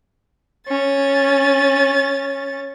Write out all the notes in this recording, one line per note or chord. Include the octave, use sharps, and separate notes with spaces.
C#4 A6